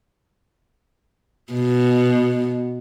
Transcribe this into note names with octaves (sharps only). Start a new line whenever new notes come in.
B2